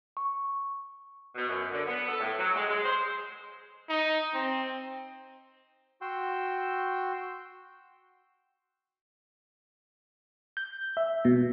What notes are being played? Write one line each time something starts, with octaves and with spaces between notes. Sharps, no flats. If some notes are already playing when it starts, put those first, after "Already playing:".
C#6
B2
F#2
D3
B3
A4
A2
F#3
G#3
G#3
C5
D#4
C4
F#4 G5 C6 E6
G6
E5
B2